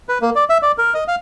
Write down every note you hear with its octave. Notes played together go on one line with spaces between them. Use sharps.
B4
A#3
D5
E5
D5
A#4
D#5
F5